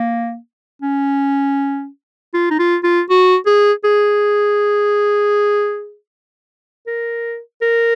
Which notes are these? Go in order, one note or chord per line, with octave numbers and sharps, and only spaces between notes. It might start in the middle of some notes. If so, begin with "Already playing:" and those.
Already playing: A#3
C#4
F4
D#4
F4
F4
F#4
G#4
G#4
A#4
A#4